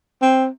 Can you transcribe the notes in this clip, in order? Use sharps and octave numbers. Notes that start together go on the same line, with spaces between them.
C4